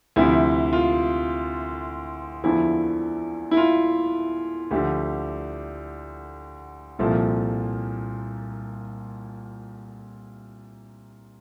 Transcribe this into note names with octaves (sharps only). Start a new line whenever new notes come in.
D2 C3 F3 E4
F4
E2 D3 F3 E4
E4
F4
D2 D3 F3 G4
C2 A#2 F3 A4